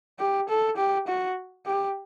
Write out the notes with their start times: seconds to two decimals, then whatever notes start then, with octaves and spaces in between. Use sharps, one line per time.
0.20 G4
0.49 A4
0.77 G4
1.07 F#4
1.66 G4